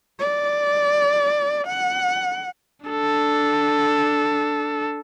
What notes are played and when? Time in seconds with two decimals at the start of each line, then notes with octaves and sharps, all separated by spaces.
0.20 D5
1.67 F#5
2.86 D4 A4